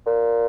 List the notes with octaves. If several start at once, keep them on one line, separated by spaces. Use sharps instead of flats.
A#2